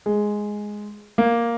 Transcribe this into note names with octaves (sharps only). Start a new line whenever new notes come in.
G#3
A#3